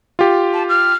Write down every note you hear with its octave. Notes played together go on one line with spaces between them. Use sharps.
F4 G4
A5
F6